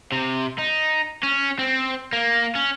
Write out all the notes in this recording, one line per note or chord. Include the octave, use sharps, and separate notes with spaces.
C3
D#4
C#4
C4
A#3
C#4